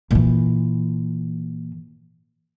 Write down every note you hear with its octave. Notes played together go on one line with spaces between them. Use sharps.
A#2 E3